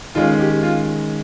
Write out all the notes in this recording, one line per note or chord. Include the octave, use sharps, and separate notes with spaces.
D#3 G#3 C#4 F4
G4
F4